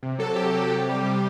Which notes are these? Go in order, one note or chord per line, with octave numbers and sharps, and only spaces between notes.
C3
F#3 A4
C3 G4
F#3
C3
G3
C3